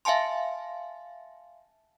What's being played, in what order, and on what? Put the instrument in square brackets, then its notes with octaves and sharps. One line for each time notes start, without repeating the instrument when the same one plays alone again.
[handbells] E5 F5 G#5 A5 C6